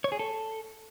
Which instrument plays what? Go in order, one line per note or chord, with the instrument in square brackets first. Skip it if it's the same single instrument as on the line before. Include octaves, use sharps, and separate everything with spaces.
[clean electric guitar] C#5
G#4
A4